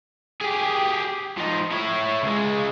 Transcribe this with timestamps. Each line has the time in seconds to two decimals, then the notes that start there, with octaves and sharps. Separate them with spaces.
0.41 G4 G#4
1.38 F3 D#4
1.72 E4 C#5
2.23 C#2 G#3